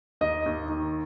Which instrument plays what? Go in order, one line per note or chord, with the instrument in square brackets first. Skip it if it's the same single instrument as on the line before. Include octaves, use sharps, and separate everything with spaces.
[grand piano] D#2 D#5
D#2
D#3